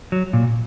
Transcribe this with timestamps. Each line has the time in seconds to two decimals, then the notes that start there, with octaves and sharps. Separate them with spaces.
0.12 F#3
0.33 A#2